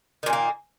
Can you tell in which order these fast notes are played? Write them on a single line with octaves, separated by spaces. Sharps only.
D#3 A#2 C#4 A#3